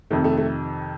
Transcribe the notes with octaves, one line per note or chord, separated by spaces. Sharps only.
F2 C3 D#3 A3
A3
A3